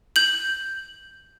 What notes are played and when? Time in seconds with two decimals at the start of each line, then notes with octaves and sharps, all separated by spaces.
0.16 G6 F#7